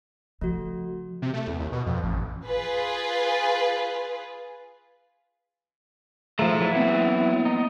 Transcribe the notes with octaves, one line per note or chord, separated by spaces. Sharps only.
C#3 F3 A3 F#4
C3
A3
E2
D#2
B2
F2
A1
F4 G#4 B4
F3 A3 G#4 A#5
E3 F#3 E4
B3 C4
D#4